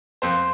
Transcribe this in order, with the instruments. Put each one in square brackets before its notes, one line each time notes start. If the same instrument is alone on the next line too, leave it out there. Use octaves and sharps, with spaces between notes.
[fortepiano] F2 C5